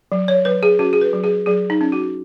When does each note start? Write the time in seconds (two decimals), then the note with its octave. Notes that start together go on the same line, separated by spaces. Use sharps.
0.12 F#3
0.28 C#5
0.45 F#3 B4
0.63 G#4
0.79 C#4 F#4
0.93 G#4
1.01 B4
1.13 F#3
1.24 G#4
1.46 F#3 G#4
1.70 D#4
1.81 C#4
1.92 F#4